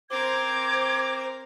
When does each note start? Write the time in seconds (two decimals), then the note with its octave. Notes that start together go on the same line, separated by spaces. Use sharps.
0.10 C4 A#4 C5 D6 G#6